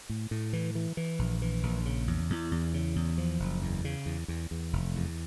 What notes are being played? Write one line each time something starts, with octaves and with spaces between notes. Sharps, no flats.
A2
A2
E3
E3
E3
A#1
E3
A#1
C#3
E2
E2
E2
C#3
E2
F3
F#1
E2
C#3
E2
E2
E2
F1
E2